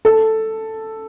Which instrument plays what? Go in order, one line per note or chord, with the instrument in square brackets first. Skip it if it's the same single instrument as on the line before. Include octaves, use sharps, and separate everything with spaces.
[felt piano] A4